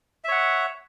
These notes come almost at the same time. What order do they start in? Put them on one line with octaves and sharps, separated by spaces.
E5 C#5 F#5